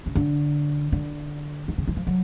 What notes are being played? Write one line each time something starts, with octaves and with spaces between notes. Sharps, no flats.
C#3
D3
D3
D#3
C#3
E3
F3
F#3